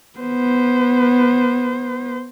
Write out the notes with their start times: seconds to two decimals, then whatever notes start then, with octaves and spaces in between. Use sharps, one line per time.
0.19 B3 C5